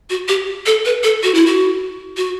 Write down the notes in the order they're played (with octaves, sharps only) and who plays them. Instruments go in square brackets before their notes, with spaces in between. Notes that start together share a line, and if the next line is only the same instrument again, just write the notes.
[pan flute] F#4
G4
A4
B4
A4
F#4
E4
F#4
F#4